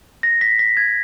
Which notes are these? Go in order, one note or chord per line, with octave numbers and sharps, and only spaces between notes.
A#6
B6
B6
G#6